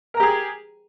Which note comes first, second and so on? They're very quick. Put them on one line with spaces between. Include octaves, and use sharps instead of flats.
A#4 A#5 G4 G#4